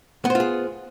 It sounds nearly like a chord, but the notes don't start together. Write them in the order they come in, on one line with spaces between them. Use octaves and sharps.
B3 C5 F4 G#4